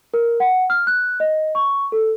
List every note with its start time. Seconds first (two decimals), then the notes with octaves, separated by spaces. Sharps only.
0.14 A#4
0.40 F#5
0.70 F6
0.87 F#6
1.20 D#5
1.55 C#6
1.92 A4